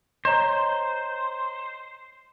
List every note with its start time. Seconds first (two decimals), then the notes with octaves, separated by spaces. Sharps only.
0.25 C5 C#5 D#5 A#5